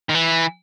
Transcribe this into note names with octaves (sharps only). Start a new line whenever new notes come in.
D#3
E3